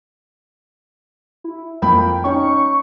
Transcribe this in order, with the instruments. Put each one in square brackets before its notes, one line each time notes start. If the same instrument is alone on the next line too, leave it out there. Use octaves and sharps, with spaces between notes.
[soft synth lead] E4
[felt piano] F2 A#3 B5 [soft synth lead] G5
[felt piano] C#4 D#4 [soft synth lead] C#6